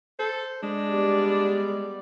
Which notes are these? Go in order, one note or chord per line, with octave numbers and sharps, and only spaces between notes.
A4 C5
G#3 D4
G3 B3 D5